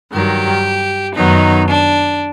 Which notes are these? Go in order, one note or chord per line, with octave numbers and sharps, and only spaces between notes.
G2 D#3 F#3 G4
F#2 D#3 F#3 B3 D#4
D4